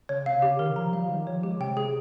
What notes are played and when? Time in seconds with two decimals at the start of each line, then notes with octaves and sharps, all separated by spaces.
0.09 C#3 C#5
0.26 C3 F5
0.42 C#3 G4
0.59 D#3 A#4
0.76 F3 A#5
0.93 G3 F5
1.05 F3
1.10 D#3 G4
1.27 F3 C#5
1.43 G#3 G4
1.60 C3 G5
1.77 G#4